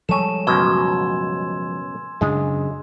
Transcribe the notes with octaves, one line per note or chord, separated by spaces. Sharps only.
F3 G3 G#3 A4 C#5 G#5 E7
C#2 F#2 B2 C6 E6 G#6
F#2 C#3 G#3 D4